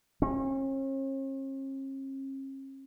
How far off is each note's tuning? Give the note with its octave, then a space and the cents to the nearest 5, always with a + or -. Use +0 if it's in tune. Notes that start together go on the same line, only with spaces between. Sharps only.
C#4 -45